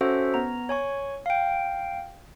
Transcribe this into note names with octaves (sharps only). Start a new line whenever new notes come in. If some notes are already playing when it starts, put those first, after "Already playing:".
C#4 F#4 A4 C5 E5 F#5
B3 A#5
C#5 G#5 C#6
F5 G5